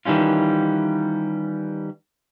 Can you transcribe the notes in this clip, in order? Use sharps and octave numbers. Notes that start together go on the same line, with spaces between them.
D#3 E3 G3 C#4 F4